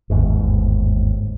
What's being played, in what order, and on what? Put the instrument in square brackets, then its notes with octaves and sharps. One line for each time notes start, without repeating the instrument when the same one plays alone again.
[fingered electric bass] G1 D#2 G#2